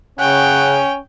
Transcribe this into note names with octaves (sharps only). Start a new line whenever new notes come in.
C#3 C#4 F#5 G5